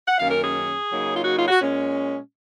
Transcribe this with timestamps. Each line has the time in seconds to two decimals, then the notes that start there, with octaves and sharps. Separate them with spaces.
0.07 F#5
0.18 F#2 D#3 A#3 C#4 F5
0.30 A#4
0.42 G#4
0.89 C#3 F#3 A#3 D#4
1.15 F4
1.25 F#4
1.37 F4
1.48 F#4
1.60 A#2 G#3 C#4